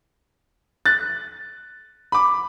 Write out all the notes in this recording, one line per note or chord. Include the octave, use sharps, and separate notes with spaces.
F#6 A6
B5 D6